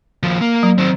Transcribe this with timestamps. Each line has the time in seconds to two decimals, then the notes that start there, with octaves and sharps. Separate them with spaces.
0.23 D#2 F3
0.41 A#3
0.63 F#3
0.78 D#3 C4